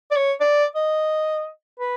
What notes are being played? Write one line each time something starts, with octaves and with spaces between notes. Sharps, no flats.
D5
C#5
D5
D#5
B4